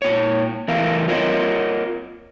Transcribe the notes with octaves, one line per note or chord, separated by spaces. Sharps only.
A#2 C#5
E3 A3 A#4 F5
F4 A#4 C#5 D#5